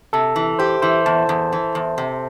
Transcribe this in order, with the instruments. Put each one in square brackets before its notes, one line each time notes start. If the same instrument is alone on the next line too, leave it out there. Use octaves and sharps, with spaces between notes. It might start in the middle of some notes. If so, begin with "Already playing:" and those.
[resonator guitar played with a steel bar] C3 [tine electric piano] A4
[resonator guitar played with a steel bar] E3
[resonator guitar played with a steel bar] G4 [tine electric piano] C5
[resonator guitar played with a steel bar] E3 [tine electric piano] C5
[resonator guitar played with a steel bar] E2 [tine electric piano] A5
[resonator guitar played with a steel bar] E2
E3
E2
C3